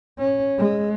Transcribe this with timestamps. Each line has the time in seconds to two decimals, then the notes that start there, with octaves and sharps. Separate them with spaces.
0.18 C#4
0.58 G#3